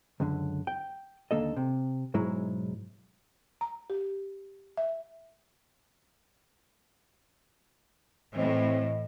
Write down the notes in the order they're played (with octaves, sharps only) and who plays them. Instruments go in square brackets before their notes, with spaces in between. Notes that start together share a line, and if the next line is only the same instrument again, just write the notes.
[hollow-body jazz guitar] C#2 F#2 D3
G5
D#2 D3 A#3 A4 D#5
C3
B1 G#2 F#3 G#3 E4 A#5
[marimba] A#5
G4
E5
[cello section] A2 E3 [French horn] C4 [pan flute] D#5